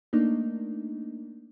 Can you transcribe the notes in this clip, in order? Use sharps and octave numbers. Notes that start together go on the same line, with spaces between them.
A3 A#3 D4 D#4